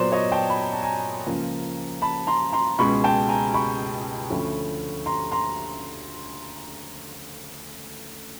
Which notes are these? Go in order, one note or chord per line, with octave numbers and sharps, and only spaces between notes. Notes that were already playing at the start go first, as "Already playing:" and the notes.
Already playing: A#2 F#3 B3 C5 D5
C#5 D#5
G5 A5
B5
A#5
A5
G#5 A#5
C#2 C#3 F3 A#3
A5 B5
A#5 C6
A#5 C6
C#2 B2 G#3 B5 C#6
G5 A5
G#5 A#5
B5 C#6
D2 D3 F3 A3 C#4
A#5 C6
A#5 C6